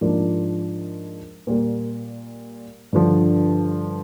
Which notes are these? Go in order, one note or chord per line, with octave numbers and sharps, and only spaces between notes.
G#2 F3 A#3 D4 F4
A#2 G3 A#3
G2 D3 F3